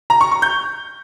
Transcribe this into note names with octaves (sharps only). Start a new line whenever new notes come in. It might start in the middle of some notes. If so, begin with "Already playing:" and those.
A#5
C#6
C#6
G6